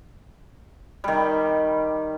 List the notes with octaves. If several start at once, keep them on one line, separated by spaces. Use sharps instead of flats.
D#3 G3